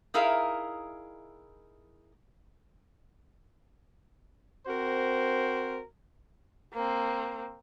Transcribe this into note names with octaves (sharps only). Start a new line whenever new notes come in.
D#4 E4 G#4 A#4 E5 F5
C4 F#4 A#4 C5
A#3 C4